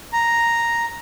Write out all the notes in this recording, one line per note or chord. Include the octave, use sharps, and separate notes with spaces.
A#5